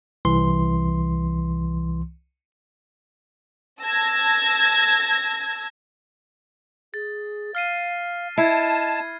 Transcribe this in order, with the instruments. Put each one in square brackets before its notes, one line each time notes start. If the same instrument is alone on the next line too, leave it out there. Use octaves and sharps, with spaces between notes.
[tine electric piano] C2 E3 C6
[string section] A5 E6 G#6 A#6
[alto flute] G#4 [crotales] A6
[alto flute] F5 [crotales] F6 C7 D#7
[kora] E4 [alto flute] D#5 [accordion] A5 [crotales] G#6 C7